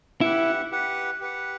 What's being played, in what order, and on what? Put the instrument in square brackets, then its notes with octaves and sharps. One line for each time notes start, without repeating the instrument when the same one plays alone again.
[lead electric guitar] E4 [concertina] G4 B4 F#5
[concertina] G4 B4 F#5
G4 B4 F#5